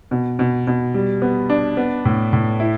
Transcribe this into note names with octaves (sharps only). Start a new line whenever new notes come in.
B2
B2
B2
G3
B3
D4
B3
A2
A2
E4